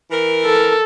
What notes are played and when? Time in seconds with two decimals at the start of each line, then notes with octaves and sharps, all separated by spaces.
0.11 E3 A#4
0.46 A4